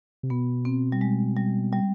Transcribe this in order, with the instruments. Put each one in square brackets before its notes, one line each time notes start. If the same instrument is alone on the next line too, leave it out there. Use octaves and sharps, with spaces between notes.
[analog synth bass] C3
[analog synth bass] B2 [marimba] B3
[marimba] C4
G3
G#3
G3
G3